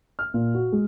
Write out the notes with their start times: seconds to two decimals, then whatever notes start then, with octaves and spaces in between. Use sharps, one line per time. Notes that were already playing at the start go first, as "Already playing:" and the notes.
0.19 F6
0.34 A#2
0.55 F#4
0.72 G#3